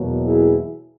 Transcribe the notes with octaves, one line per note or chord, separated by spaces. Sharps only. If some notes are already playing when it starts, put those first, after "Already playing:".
Already playing: E2 B2 F#3 A#3
E4 G#4